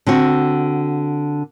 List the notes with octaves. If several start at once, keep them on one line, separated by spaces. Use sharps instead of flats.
D3 C4 F#4